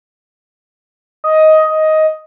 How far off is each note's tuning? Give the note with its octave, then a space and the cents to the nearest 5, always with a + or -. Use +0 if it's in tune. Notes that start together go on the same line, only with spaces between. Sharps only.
D#5 +10